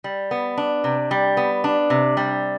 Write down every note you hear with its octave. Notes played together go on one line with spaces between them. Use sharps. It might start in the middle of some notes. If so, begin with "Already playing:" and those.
G3
B3
D4
C3
G3
B3
D4
C3
G3